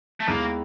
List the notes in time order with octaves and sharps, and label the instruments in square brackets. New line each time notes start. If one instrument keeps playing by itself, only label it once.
[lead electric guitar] A3
[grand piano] D#2 D#3 G#3 B3 E4 [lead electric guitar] A#3